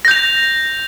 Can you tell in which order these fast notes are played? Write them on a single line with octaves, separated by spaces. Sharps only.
A#6 G6 F7